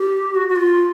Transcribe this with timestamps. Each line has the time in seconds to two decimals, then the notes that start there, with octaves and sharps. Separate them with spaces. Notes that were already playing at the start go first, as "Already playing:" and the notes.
Already playing: G4
0.35 F#4
0.49 F#4
0.56 F4